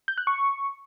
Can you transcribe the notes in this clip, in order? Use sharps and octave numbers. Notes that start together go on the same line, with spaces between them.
G6
F#6
C#6